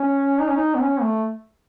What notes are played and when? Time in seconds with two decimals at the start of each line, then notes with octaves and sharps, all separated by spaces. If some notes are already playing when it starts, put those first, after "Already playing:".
Already playing: C#4
0.40 D#4
0.48 C#4
0.57 D#4
0.75 B3
0.81 C#4
1.01 A3